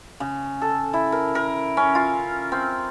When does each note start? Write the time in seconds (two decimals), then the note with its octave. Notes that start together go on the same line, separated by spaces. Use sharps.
0.20 C#3
0.61 A4
0.93 E4
1.12 A#4
1.35 A#4
1.77 C#4
1.95 F4
2.52 C4